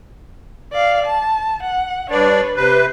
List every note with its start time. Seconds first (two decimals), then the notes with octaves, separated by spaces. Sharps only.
0.73 D5 F5
1.06 A5
1.63 F#5
2.10 G2 D4 B4 C#5 D5
2.56 C3 B4 C5